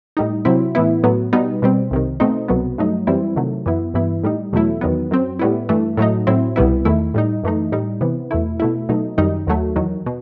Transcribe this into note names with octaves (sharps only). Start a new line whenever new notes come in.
A2 G3 D#4
C3 F#3 C4 E4
A2 E3 B3 E4
A2 F#3 B3
B2 G3 B3 D#4
B2 G3 C4
C2 C3 D#3
B2 A3 C4 D#4
C2 B2 F#3 B3
G2 F#3 A3 D#4
F#2 E3 G3 C4 E4
C3 D#3 F#3 A3
F#2 E3 B3 E4
G2 E3 B3 E4
A2 G3 D#4
E2 B2 F#3 A3 E4
E2 D#3 F#3 B3
F#2 F#3 C4
A2 G3 B3 E4
G2 E3 A3
A2 F#3 A3 D#4
A2 F#3 C4 E4
C2 B2 G3 B3 E4
E2 D#3 A3 E4
A2 G3 D#4
F#2 E3 A3 D#4
A2 G3 D#4
C3 E3 B3
E2 B2 A3 E4
B2 A3 E4
B2 F#3 A3 D#4
F#2 D#3 G3 D#4
D#2 D#3 F#3 A3
E2 D#3 F#3
B2